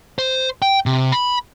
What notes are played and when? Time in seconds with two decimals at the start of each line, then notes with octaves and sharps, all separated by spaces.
0.19 C5
0.62 G5
0.86 C3
1.12 B5